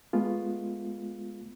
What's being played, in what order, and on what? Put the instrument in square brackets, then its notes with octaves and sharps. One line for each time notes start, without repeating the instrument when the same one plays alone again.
[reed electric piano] G#3 A3 B3 F4